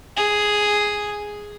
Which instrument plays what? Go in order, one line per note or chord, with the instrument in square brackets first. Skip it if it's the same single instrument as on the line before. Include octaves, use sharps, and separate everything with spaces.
[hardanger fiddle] G#4